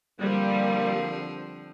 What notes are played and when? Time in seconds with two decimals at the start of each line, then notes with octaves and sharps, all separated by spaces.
0.20 D3 F3 G3 A#3 C4